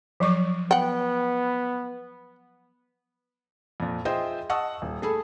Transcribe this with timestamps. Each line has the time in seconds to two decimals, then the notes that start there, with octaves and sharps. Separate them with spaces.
0.20 F3 F#3 C#6
0.71 B3 F#5 G5
3.80 F2 A#2
4.05 F4 G#4 C5 D#5 E5 G5
4.49 D#5 F#5 A5 C#6 D#6 E6
4.82 D#1
5.02 A3 G#4 A4 B5